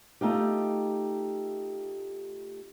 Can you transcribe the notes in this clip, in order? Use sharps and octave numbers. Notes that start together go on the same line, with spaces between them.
A3 D#4 F4 G4